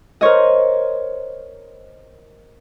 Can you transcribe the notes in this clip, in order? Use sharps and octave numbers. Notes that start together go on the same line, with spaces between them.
A#4 C5 C#5 D#5